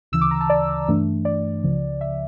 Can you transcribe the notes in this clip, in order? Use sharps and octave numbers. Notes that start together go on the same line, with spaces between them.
D2 C#3 E3 E6
D6
A#5
A5
D5
G2 E3 A3 D4
D5
C#2 C#3 F3
E5